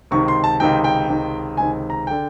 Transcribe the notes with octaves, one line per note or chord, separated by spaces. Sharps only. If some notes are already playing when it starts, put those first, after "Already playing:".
C#2 C3 D#3 C#6
C6
A5
C#2 C3 D#3 G5
G5
C#2 C3 D#3
C#2 C3 D#3 G#5
A#5
D3 G5